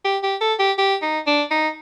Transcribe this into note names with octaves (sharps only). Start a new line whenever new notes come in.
G4
G4
A4
G4
G4
D#4
D4
D#4